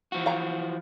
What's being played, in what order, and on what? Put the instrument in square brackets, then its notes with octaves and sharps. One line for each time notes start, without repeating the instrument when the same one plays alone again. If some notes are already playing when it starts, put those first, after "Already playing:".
[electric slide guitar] E3 F3 F#4
[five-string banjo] F5 A#5